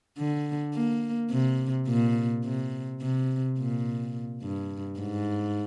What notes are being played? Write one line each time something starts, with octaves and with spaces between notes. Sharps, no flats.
D3
A#3
C3
A#2
C3
C3
A#2
G2
G#2